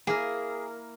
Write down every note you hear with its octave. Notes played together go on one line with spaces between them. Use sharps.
A#3 E4 G#4 A#4